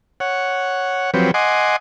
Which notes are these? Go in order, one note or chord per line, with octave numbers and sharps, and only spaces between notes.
C#5 F#5
F3 F#3 C4 G4 B4 C#5
D#5 F#5 G#5 C6 D6